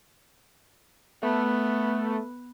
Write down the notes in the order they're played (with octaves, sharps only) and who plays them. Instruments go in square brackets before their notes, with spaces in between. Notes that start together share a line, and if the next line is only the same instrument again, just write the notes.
[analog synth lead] A3 [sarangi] B3